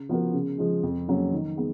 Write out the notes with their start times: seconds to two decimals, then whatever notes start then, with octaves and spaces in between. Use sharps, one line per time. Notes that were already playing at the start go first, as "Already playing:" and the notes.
Already playing: C#3
0.09 F3 B3 F#4 A#4
0.34 C#3
0.58 F3 G#3
0.83 F2
1.08 C#3 F#3 A#3 C#4
1.32 D#3
1.57 G#3 B3